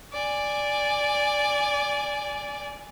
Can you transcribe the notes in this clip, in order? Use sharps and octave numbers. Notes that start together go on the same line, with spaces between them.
D5 G#5